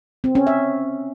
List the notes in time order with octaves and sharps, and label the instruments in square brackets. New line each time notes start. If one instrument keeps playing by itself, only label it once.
[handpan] C4
C#4
E5